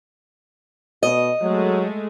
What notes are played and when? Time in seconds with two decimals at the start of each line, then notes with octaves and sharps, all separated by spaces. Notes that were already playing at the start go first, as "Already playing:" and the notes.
1.03 B2 D#5
1.41 F#3 G#3 A3